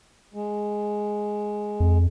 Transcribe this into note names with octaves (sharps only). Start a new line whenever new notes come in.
G#3
F2